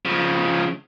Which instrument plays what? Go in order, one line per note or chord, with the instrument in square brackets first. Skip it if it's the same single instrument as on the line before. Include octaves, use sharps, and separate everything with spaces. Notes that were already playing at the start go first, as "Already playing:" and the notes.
[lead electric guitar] C#3 F3